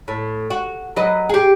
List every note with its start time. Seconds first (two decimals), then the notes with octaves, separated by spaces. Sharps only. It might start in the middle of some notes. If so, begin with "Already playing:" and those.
0.08 A2
0.50 F#4
0.96 F#3 B4 D#5
1.29 G4 G#4